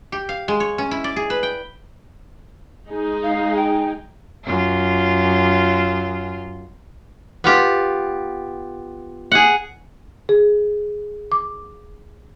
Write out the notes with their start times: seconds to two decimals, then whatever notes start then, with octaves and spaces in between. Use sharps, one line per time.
0.12 G4
0.29 F5
0.48 G#3
0.60 C#5
0.78 C#4
0.91 E4
1.04 D5
1.16 G#4
1.30 B4
1.43 G5
2.88 G#3 D#4 G#4
3.23 F5
3.56 G5
4.44 F#2 F4
7.44 B3 F4 G4
9.32 G#4 F#5
10.29 G#4
11.32 D6